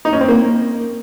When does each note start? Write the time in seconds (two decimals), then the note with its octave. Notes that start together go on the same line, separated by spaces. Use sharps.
0.05 D#4
0.13 C#4
0.21 C4
0.28 A#3